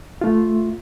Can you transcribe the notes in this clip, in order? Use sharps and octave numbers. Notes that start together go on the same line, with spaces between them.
A3 F4